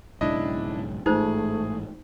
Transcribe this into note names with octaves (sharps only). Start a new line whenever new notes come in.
B1 G#2 C#3 D4 E4 D#5
A1 G#2 A3 D#4 F4 G#4 C5